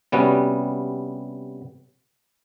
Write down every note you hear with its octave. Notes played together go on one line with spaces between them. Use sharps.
C3 G3 B3 C#4 F#4